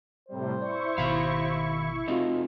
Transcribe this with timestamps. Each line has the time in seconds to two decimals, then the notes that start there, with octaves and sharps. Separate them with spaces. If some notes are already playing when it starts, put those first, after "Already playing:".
0.29 A2 C3 G3 C5
0.62 E4 D5 C#6
0.98 G#1 B2 D#3 F5 B5
2.08 A3 C4 D#4 F4 F#4 D#5